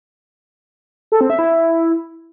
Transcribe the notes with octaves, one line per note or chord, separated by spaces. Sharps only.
A4
C4
E5
E4